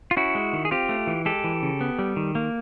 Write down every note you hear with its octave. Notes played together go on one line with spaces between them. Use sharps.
F4
C#4 E4 F#4
G#3
D#3
G#4
C4 F4 G4
A3
E3
G#3 G4 A4
E3
C#3
B3
G3
D#3
A#3